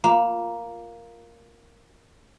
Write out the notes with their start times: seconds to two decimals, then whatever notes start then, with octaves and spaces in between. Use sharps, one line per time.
0.04 A#3 F4 C#5 A#5